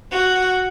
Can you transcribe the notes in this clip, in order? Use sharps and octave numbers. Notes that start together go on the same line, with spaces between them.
F#4